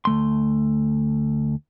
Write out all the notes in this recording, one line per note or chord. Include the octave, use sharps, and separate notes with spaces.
D2 A3 C6